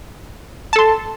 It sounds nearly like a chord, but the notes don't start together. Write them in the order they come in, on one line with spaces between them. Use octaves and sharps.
A5 A4 C6